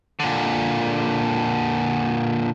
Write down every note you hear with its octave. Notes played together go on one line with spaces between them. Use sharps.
A#2 D3